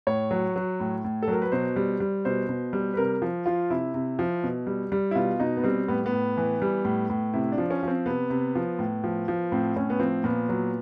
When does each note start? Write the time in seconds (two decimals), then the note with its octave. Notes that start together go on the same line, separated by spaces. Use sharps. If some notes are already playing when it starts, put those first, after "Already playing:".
0.07 A2 C#5
0.31 F#3
0.56 F#3
0.80 A2
1.04 A2
1.23 A4
1.28 F#3 A#4
1.42 B4
1.52 B2 C5
1.76 G3
2.00 G3
2.25 B2 C5
2.49 B2
2.73 G3
2.94 B4
2.97 C3 A#4
3.22 F3
3.46 F3 F4
3.70 C3 E4
3.94 C3
4.19 F3
4.43 B2
4.67 G3
4.92 G3
5.11 E4
5.15 B2 F4
5.40 B2 D#4
5.57 B3
5.64 G3 C4
5.88 A2 B3
6.06 B3
6.12 A2
6.37 E3
6.62 G3
6.85 A2
7.10 A2
7.34 C3 E4
7.52 D4
7.58 F3
7.71 C#4
7.83 F3 C4
8.06 C3 B3
8.30 C3
8.55 F3
8.79 A2
9.04 F3
9.28 F3
9.52 A2 C4
9.76 A2 C#4
9.90 B3
10.00 F3 C4
10.24 A#2 B3
10.49 F#3